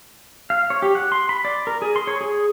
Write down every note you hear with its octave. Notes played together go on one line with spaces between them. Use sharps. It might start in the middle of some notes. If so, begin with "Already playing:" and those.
F5
C#5
G4
F#5
C6
B5
D5
A#4
G#4
C6
C#5
G#4